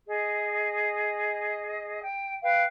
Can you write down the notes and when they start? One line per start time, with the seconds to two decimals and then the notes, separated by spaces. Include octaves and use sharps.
0.07 G#4 D#5
2.03 G5
2.42 B4 F5 G5